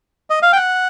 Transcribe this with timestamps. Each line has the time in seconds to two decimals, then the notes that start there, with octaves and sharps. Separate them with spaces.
0.30 D#5
0.42 F5
0.53 G5
0.56 F#5